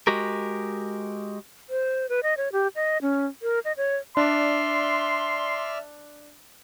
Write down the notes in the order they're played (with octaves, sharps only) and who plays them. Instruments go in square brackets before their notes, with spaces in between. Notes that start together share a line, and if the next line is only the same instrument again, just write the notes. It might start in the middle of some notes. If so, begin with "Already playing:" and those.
[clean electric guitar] G#3 F#4 G4 A#4
[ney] C5
B4
D#5
C#5
G4
D#5
C#4
A#4
D#5
C#5
[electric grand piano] D4 [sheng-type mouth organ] D5 E5 F6 [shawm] C6